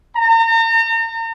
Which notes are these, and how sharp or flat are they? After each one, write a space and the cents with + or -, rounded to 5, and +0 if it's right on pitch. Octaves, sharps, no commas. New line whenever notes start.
A#5 -40